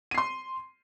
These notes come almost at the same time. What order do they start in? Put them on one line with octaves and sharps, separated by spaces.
D#7 C7 C6